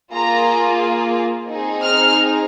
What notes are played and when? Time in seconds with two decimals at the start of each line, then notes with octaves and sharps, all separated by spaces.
0.13 A#3 F4 G#4 A#5
1.49 C4 D#4 G#4
1.84 F6